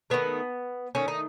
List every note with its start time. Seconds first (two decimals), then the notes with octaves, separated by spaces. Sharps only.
0.10 D#3 A3 B3
0.95 D#3 A3 C#4
1.08 D#4